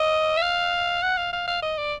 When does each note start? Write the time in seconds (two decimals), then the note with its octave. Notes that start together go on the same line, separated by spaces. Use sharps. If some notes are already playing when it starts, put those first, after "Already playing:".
Already playing: D#5
0.37 E5
0.42 F5
1.03 F#5
1.18 F5
1.33 F5
1.48 F5
1.62 D#5
1.78 D5